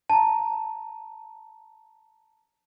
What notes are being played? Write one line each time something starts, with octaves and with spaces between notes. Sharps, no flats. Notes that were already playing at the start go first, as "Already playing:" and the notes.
A5 A#5